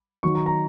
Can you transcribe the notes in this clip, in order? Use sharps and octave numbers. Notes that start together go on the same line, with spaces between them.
D#3 F#3 D#4 C#6
A#5
A#5